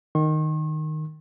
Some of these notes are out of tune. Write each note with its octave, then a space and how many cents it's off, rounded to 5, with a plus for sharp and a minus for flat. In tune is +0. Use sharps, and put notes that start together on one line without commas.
D#3 -10 C#6 -45